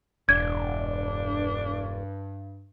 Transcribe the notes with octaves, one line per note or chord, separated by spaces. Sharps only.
E1 G2 D4 G#6